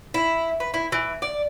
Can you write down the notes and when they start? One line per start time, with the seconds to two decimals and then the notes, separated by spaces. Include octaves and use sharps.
0.14 E4
0.60 B4
0.74 E4
0.92 E3
1.22 D5